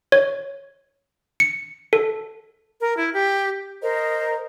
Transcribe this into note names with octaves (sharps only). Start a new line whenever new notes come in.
C#5
C#7
A4
A#4
E4
G4
A#4 C5 D#5